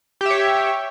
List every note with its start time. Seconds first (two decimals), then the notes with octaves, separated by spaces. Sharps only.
0.21 G4
0.26 E5
0.30 C#5